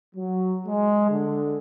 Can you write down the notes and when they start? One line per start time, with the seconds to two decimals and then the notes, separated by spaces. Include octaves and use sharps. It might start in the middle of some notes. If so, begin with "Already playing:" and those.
0.15 F#3
0.67 G#3
1.10 D3